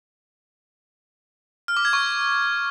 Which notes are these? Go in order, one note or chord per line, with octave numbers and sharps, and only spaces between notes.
F6
D6
G#6
C#6